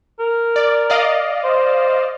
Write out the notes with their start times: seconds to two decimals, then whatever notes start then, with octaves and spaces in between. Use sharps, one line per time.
0.19 A#4
0.56 D5
0.90 D5 D#5 F5
1.44 C5